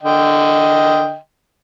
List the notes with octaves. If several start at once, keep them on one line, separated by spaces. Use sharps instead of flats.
D3 D#5 G5